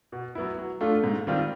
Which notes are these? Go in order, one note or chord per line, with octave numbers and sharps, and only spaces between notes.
B2
F#3 B3 E4
F#3
A3 D4 F4 A4
G#2
D#3 G3 C4 F4